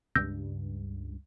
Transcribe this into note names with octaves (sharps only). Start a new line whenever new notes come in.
C#2 G2 E6 G6 A#6